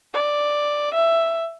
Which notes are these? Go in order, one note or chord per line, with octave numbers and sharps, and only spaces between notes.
D5
E5